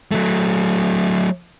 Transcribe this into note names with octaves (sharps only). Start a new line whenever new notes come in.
F#3 A3